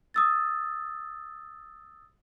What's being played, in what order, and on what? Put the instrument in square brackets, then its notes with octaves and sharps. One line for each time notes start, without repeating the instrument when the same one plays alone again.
[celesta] D#6 E6 A6